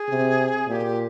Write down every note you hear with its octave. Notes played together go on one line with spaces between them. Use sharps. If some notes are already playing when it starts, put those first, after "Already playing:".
Already playing: G#4
C3
A#2 G4 G#4